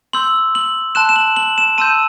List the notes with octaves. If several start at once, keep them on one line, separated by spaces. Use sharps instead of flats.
C6 E6 G6 F#7
F#7
A5 C6 F#6 E7
E7
F#7
F#7
E7
A5 C6 E6 G6 D#7